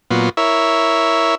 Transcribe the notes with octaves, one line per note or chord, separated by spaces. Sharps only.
A#2 F#3 B3 F4
E4 A#4 C#5 E5